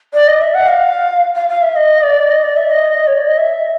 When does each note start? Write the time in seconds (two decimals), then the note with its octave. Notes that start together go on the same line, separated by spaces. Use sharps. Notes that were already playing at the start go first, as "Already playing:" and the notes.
0.14 D5
0.28 D#5
0.41 E5
0.54 F#5
0.68 F5
1.35 F5
1.49 F5
1.62 E5
1.76 D#5
2.02 D5
2.30 D#5
2.43 D5
2.56 E5
2.70 D#5
3.07 C#5
3.17 D5
3.28 D#5
3.38 E5